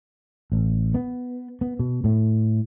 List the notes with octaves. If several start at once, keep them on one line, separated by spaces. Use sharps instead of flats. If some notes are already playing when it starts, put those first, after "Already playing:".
A1
B3
B3
B2
A2